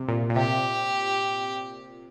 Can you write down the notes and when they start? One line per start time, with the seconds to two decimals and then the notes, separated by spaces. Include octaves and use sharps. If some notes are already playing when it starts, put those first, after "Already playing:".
Already playing: C3
0.08 A#2
0.29 A#2
0.36 C3 G4